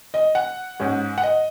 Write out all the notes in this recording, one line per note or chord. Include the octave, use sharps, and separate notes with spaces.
D#5
F#5
G#2 G#3 C#4
F#5
D#5